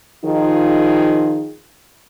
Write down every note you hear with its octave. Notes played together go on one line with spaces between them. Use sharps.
D#3 F3 D#4 F4 G#4